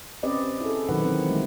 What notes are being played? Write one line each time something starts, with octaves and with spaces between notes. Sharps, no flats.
C4 C#4 G4 B4 D5 D#5
E4 G#4 A4
B2 D#3 F#3 D#4 B4 F#5
E3 C4
G#3 A3 D#4 G4